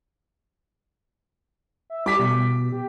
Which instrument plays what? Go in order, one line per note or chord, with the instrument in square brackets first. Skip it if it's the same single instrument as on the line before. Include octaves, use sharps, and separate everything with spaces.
[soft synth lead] E5
[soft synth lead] G3 [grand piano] D6 B6
[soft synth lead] B2
G4